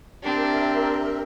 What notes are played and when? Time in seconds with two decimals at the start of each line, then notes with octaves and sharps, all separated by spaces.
0.23 C4 D4 G4 A#4 E5